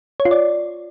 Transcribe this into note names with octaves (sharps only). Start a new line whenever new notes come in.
C#5
F4
D5